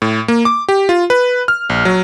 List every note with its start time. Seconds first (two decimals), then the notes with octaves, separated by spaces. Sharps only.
0.02 A2
0.28 A#3
0.45 D6
0.69 G4
0.89 F4
1.10 B4
1.48 F6
1.70 A#1
1.85 F#3